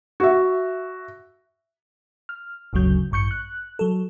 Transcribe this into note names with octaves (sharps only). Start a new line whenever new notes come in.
F#4 E5
F6
G1 D2 C#3 F#3 G6
A1 G2 C#6 G6 C#7
F#6
F#3 A4